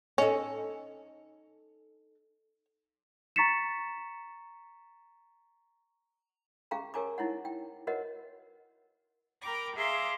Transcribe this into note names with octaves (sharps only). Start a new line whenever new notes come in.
C#4 D#4 A4
A#5 C#6 A6 B6 C#7 E7
C#4 G4 G#4 F5 G5 A#5
G4 A#4 C#5 G#5 A#5 D6
D#4 E4 C#5 F#5
G5
F#4 A#4 B4 C#5 D#5 F#5
A#4 G5 A#5 B5 D6
G#4 E5 F5 A#5 C6 D6